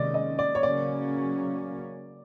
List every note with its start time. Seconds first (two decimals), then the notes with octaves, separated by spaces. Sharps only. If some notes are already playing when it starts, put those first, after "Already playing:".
Already playing: C3 D#3 G#3 C#4 D5 D#5
0.14 D#5
0.39 D5
0.55 C#5
0.63 C#3 F#3 A#3 C#4 D5